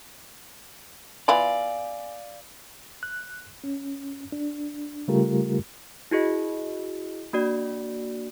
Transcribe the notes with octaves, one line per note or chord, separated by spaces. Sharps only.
B3 E4 F4 D5 F5 G#5
F#6
C#4
D4
C#3 G3 A3 F4 G4 A#4
E4 F#4 G#4 D#5
A#3 D4 F#4 D5